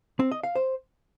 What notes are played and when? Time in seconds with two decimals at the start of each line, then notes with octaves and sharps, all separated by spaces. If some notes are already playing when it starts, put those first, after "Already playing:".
0.20 C4
0.32 D#5
0.43 F5
0.55 C5